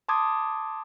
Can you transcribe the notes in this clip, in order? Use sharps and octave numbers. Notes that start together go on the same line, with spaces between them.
A5 C6 D6 D#6 G#6